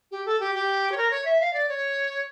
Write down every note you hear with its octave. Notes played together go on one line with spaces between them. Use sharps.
G4
A4
G4
G4
C#5
A#4
C#5
E5
F5
D5
C#5